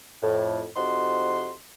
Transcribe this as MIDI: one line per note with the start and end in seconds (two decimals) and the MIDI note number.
0.23 0.65 41
0.23 0.65 45
0.76 1.52 41
0.76 1.52 48
0.76 1.52 53
0.76 1.52 63
0.76 1.52 66
0.76 1.52 84